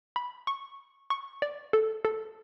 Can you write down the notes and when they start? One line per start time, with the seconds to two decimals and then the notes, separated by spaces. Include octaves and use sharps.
0.16 B5
0.47 C#6
1.10 C#6
1.42 D5
1.73 A4
2.05 A4